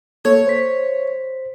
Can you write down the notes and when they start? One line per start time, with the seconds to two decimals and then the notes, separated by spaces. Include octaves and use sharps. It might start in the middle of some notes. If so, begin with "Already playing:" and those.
0.25 A#3 A4 C#5 G#6
0.47 C5 B6